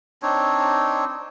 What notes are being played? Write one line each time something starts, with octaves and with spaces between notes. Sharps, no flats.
C4 D4 D#4 C#5